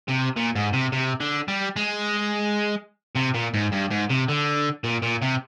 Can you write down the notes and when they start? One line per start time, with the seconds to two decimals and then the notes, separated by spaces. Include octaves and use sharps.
0.08 C3
0.36 A#2
0.55 G#2
0.73 C3
0.93 C3
1.21 D3
1.48 G3
1.76 G#3
3.16 C3
3.35 A#2
3.54 G#2
3.72 G2
3.90 G#2
4.10 C3
4.28 D3
4.84 A#2
5.03 A#2
5.22 C3